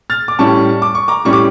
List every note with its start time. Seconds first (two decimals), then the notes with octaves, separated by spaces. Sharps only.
0.10 F6 A6
0.28 D6
0.39 A2 G3 C#4 A5 C#6
0.82 D6
0.95 C#6
1.08 A#5 D6
1.25 A2 G3 C#4 C#6
1.33 D6